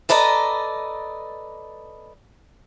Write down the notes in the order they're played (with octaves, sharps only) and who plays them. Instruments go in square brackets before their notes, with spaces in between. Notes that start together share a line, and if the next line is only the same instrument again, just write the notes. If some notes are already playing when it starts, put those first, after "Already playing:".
[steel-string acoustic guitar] A4 B4 D5 D#5 A#5